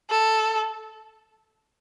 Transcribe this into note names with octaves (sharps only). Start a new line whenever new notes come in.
A4